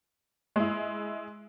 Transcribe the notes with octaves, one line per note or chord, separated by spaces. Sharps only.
G#3 E4